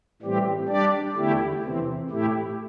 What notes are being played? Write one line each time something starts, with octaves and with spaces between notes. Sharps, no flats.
A2 E3 G3 C4 G4
G3 D4 G4 D5
E2 D3 A3 E4 G4
E2 C3 E3 C4
A2 A3 E4 G4